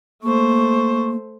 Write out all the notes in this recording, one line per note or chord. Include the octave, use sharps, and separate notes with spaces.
A3 A#3 C5 C#6